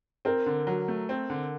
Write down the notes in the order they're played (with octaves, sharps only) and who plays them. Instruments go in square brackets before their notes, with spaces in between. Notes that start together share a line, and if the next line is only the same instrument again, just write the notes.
[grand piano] C4 [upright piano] A#4
[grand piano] D3
F#3
A3
C4
D3